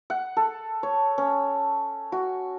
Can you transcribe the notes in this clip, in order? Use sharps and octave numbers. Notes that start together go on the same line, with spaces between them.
F#5
A4
C#5
C#4
F#4